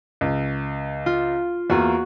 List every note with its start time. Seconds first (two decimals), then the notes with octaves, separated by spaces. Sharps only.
0.21 C#2
1.06 F4
1.70 E2 A#3 F4 F#4